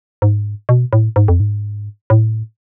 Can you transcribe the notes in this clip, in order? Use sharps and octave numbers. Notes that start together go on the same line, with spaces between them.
G#2
B2
A2
G#2
F2
G#2
A2